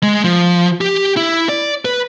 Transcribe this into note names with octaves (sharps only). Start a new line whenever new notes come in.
G#3
F3
G4
E4
D5
B4